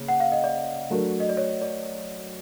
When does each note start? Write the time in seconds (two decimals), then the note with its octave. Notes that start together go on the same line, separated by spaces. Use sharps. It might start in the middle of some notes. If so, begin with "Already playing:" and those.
Already playing: C#3 A#3
0.08 F#5
0.20 F5
0.32 D#5
0.44 D5
0.90 F#3 A3 D4 F#4 A#4
1.20 D#5
1.29 D5
1.37 C#5
1.62 D5